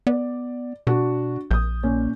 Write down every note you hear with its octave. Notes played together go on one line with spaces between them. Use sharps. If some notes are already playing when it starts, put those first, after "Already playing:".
B3 D5
B2 D4 F#4
A#1 D#6 G6
A#2 C#4